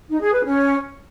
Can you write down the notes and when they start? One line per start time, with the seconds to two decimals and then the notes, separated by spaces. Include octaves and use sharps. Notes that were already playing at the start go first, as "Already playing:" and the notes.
0.08 D#4
0.20 G#4
0.32 B4
0.43 C#4